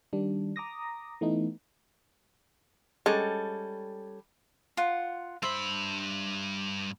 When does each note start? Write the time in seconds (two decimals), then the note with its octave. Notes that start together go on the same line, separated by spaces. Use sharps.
0.13 D#3 G3 D4
0.56 A#5 D6 D#6 A#6
1.21 E3 A3 B3 D#4
3.06 G3 G#3 C#4 A4
4.77 F4 F#5
5.43 G2 C5 E5 B5